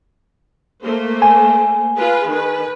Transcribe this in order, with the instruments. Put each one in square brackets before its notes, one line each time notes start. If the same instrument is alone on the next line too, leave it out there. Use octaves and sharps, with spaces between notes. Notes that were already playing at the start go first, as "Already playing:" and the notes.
[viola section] A3 A#3 C5
[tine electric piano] G#5
[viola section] F4 G#4 B4
D#3 B4